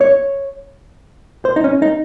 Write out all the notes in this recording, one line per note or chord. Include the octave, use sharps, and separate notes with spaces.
C#5
C5
D#4
C#4
D#4